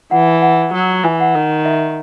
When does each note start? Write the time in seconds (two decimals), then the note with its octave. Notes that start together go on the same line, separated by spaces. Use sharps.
0.11 E3 F#5
0.42 F#5
0.73 F#3
1.04 E3 G#5
1.20 F#5
1.35 D#3
1.66 E5